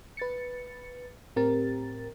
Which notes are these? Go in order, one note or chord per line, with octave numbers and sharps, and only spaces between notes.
B4 A6 C#7
A2 C4 G4 A#4 A6